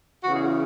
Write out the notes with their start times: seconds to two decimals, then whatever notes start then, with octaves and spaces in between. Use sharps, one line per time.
0.24 E2 C#3 E3 F#4
0.34 G#4
0.44 F#4